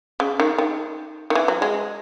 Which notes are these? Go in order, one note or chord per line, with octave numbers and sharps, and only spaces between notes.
C#3
D#3
D#3
D#3
E3
F#3
G#3